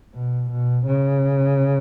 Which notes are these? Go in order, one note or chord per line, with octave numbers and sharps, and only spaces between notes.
B2
B2
C#3